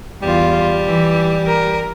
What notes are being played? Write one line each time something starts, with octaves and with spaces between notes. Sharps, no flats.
E2 G3 F4
E3
A#4